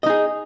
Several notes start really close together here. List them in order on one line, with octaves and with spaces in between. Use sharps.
D#5 D#4 G#4